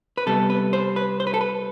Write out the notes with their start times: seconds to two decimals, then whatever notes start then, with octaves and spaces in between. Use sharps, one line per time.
0.17 B4
0.26 C3 G3 B3 A4
0.50 B4
0.73 C5
0.96 B4
1.20 C5
1.27 B4
1.34 A4
1.41 B4